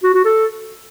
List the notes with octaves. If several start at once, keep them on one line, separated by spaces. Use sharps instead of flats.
F#4
F#4
A4